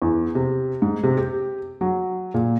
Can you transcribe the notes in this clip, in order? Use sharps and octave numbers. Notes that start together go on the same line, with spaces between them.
E2
C3
G#2
C3
G4
F#3
A#2